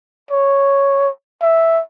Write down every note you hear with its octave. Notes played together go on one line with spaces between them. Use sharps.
C#5
E5